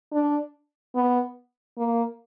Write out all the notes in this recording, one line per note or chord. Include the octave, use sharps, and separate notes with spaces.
D4
B3
A#3